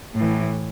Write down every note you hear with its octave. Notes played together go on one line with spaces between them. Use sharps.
A2 E3